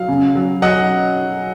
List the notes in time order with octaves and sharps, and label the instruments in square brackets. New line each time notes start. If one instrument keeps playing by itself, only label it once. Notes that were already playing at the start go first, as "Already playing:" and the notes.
Already playing: [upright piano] F#3 [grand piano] F5
[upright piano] C#3
F#3
[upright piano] F#3 [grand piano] D#5 F#5